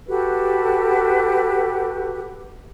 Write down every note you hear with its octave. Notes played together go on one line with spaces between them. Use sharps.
F#4 G4 A4 B4